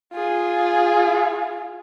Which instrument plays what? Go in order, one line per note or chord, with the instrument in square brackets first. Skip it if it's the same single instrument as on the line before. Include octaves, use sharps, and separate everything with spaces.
[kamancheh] F4 G#4